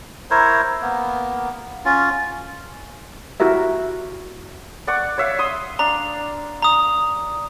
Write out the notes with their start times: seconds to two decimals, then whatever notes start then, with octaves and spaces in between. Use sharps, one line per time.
0.30 E4 A#4 C5 C#5
0.82 A#3 B3
1.85 C#4 F4
3.40 E4 F#4 G4 A#4 E5
4.87 D5 F#5 C#6
5.18 C#5 E5 F5
5.39 C6 D#6
5.79 D4 A#5
6.62 A#5 D#6